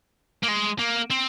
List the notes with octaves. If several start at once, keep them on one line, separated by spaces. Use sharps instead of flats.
A#3
G#3
A#3
C4